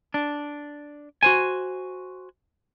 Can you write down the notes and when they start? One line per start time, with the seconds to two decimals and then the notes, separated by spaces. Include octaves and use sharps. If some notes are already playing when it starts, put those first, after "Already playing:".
0.14 D4
1.23 F#4 C5 G#5